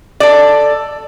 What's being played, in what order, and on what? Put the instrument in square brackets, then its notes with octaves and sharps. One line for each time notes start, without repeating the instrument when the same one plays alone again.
[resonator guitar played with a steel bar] A4 D5